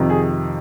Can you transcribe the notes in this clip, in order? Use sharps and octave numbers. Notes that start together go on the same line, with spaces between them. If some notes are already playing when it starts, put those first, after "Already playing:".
Already playing: F2 C3 D#3
G#4